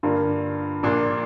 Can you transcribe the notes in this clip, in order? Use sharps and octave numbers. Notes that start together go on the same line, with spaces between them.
G2 D3 A#3 F4 A#4
A#1 A#2 A#3 D4